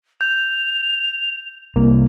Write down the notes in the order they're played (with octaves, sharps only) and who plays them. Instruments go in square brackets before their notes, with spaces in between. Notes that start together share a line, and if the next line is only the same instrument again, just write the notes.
[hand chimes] G6 [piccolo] F7
[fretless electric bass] C2 [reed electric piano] A#3